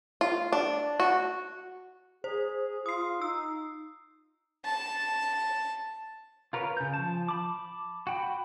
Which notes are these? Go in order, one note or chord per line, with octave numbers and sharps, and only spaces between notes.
F4
D4
F#4
G#4 C5
F4 D#6 C7
D#4 E6
A5
F4 A#4 B4 C#5
C#3 G6
F3 A5
A5 B5 D6
F#4 G5 B5